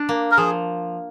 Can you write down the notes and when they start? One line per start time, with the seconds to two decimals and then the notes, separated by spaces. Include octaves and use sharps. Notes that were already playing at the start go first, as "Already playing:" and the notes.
Already playing: D4
0.09 A#3
0.31 A#4
0.37 F3 G#4